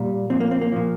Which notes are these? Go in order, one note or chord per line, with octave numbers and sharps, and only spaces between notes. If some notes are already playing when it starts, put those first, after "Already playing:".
Already playing: A#2 G3
A#2 F3 C4
A#3
C4
A#3
A#2 F3